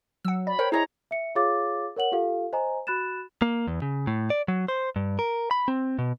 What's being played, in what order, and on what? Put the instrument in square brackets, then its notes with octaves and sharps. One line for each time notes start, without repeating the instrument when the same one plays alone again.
[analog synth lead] F#3 [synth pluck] F#5 E6
[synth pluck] D5 [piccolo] B5
[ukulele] A#4 G5 [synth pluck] C5 [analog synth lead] C#5
[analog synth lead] E4 [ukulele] G#4 C#5 D#5 [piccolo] A#5
[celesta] E5 C#7
F4 G#4 C#5 F5 D6 A6
A#4 C#5 F#5 F#7
F4 G4 A4 F5
C5 D#5 G#5 A#5
F#4 B5 F#6 A6 E7
[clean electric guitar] A#3
E2
C#3
A2
D5
F#3
C5
G2
A#4
B5
C4
B2